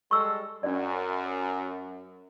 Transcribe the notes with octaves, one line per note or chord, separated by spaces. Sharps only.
G3 G#3 A4 C#6 E6
F#2 C#4 D5